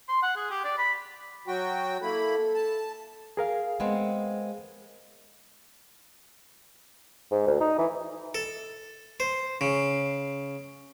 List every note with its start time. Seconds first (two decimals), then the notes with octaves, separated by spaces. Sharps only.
0.09 C6
0.23 F#5
0.36 G#4
0.51 G4
0.64 D5
0.78 B5
1.48 F#3 F#4 G5
2.02 A#3 E4 A4 B5
2.54 A5
3.37 G#4 A#4 F5
3.80 G#3 B3 C4
7.31 G#2
7.47 D2
7.61 D#4
7.78 E3
8.35 A4
9.20 C5
9.61 C#3